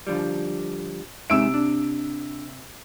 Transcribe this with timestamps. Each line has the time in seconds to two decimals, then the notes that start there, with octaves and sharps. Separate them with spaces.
0.07 D3 F3 G3
1.30 C3 G#3 D#4 E5 E6 D7
1.54 D4